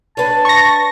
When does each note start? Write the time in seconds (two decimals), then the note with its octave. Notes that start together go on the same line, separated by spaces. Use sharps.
0.17 D4 B4 C#5 A5
0.45 C#6 A#6